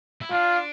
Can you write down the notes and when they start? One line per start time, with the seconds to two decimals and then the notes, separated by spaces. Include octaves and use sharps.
0.21 E4
0.31 D4 F4